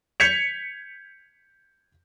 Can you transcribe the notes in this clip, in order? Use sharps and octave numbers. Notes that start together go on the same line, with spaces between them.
G6 G#6 B6 C#7 F7